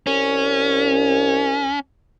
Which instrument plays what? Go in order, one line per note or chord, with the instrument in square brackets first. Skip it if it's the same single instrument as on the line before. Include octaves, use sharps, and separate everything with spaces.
[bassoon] C2 [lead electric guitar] C#4